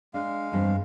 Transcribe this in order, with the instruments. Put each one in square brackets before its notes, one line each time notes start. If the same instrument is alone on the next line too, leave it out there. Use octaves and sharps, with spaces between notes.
[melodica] G#3 F5 [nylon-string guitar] D4
[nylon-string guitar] E2 G2 C4